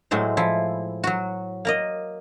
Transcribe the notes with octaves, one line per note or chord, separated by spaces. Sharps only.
A2 F#3 G#3 C5
F3 E4
F#3 F#4
A#3 A#4 D#5